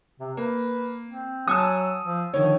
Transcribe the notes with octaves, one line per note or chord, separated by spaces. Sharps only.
C3
A#3 B4
C4
F#3 F#5 G#5 A5 D#6 E6
F3
D3 D#3 F3 C#5